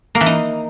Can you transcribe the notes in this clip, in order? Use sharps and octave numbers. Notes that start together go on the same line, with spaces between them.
A#3
E3
D#4